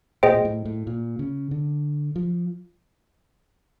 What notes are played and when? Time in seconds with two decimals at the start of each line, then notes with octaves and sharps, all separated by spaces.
0.23 A#2 G#4 C5 D#5 G5
0.35 A#2
0.45 A2
0.65 A2
0.87 A#2
1.19 C#3
1.51 D3
2.16 F3